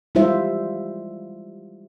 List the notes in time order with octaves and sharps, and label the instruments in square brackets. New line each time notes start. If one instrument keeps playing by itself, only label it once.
[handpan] G3 G#3 E4 F4 C5 E5